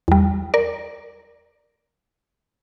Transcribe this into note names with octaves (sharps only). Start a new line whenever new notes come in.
E2 G3
A#4 D5